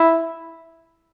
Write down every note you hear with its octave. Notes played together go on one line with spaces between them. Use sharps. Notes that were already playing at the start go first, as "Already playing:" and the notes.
Already playing: E4